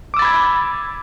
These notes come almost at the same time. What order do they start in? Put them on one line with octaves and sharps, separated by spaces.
D6 E6 A6 B5 G#6